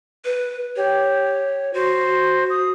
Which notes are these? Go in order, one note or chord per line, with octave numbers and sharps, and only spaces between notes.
B4
G4 C#5
F#4 C5
D#6